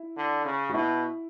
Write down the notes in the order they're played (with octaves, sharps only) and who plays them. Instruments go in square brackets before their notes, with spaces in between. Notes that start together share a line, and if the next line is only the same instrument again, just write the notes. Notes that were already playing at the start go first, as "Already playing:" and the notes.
Already playing: [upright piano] E4
[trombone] D3
C#3
[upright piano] F#4
[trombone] B2 [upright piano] E4